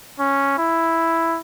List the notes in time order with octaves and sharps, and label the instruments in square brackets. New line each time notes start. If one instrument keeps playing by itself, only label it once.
[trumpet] C#4
E4